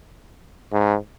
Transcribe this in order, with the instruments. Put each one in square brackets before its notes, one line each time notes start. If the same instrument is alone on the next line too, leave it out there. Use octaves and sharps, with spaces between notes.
[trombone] G#2